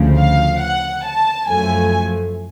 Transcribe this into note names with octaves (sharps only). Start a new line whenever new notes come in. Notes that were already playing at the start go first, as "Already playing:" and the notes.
Already playing: D2 C#3 F3
F5
F#5
A5
F#2 F3 A3 G#5